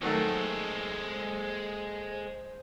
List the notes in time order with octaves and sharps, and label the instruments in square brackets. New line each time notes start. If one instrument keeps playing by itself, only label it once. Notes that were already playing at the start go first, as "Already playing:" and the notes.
[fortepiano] D#3 F#3 A3 [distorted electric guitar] G#3 A4 [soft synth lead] C5